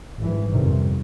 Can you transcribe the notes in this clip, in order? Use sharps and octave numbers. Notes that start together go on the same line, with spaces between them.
G#1 G2 E3
G1 F2 C3 D#3 G3